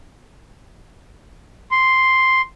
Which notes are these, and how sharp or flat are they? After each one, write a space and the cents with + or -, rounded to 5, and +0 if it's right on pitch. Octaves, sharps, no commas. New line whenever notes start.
C6 +0